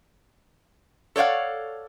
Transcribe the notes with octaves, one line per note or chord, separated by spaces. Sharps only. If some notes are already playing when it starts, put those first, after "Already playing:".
A4 C#5 D5 F5 F#5